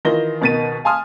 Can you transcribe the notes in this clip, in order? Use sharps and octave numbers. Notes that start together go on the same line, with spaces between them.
D#3 E3 F4 A#6 G7
C#2 B2 D#3 A6 B6 D#7
F5 G#5 A5 C6 D#6 F6